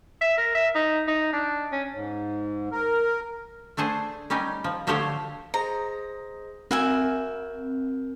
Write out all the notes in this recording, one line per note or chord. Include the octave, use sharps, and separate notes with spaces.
E5
A#4
E5
D#4
D#4
D4
C#4
G#2
A#4
A3 D4 G#4 C5
G3 C#4 D#4 G4
F3
D3 F3 A3 G4 C5 C#5
G#4 C5 D#5 A#5
C4 F#4 A#4 E5 G#5 G6